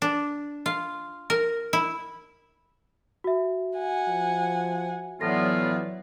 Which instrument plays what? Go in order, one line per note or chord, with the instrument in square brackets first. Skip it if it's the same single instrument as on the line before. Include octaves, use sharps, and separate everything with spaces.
[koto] D4
F4
A#4
E4
[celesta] F#4 E5
[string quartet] F#5 G#5
[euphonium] F3
[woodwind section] A2 B3 F4 [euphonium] E3 [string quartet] F#3 E4 D5 [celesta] A#6